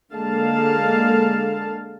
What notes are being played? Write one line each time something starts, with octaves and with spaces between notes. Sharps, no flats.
D3 G#3 A#3 F5 A5